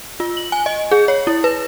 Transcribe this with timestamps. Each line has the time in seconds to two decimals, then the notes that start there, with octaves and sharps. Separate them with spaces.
0.20 F4
0.37 F#7
0.52 G#5
0.66 D#5
0.91 G#4
1.08 C#5
1.27 E4
1.44 B4